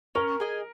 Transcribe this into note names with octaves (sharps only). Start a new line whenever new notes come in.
C#4 A#4
G#4 D#5 G#5